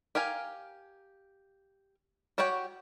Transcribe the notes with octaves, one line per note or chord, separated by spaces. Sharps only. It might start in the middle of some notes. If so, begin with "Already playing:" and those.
G4 A#4 F5 G#5
F#4 G4 C#5 F#5 G5